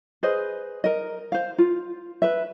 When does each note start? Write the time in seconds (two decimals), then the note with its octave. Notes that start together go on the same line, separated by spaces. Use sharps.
0.23 G#4 B4 C5 D#5
0.84 A#4 D#5
1.32 C5 F5
1.58 F4
2.22 B4 E5